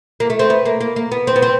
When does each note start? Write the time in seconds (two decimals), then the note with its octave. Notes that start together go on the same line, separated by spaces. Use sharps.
0.20 A#3
0.30 A3
0.39 C4
0.50 B3
0.66 A#3
0.81 A#3
0.96 A#3
1.12 B3
1.27 C4
1.36 B3
1.42 C4